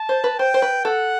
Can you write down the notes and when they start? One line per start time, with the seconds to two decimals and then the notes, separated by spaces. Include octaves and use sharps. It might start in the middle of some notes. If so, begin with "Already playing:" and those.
Already playing: A5
0.09 C5
0.24 B4
0.39 C5 G5
0.54 C5
0.62 B4
0.85 A4 F#5